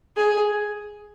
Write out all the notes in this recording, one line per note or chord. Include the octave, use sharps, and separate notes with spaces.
G#4